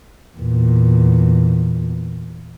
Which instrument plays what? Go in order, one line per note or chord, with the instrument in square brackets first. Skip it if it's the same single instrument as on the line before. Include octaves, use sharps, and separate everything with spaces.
[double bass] E2 A#2